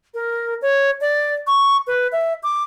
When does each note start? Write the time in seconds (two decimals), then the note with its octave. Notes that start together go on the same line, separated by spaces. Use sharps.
0.14 A#4
0.62 C#5
1.01 D5
1.47 C#6
1.87 B4
2.12 E5
2.43 D6